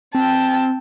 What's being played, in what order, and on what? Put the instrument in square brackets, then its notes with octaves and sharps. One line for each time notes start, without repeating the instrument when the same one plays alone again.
[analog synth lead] C4 [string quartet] G5 A5